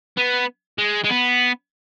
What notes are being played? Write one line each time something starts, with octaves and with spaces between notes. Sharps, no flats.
B3
G#3
G#3
B3